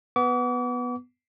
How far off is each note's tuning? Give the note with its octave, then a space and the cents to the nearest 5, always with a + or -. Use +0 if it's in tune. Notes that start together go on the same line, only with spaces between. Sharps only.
B3 +0 D6 -40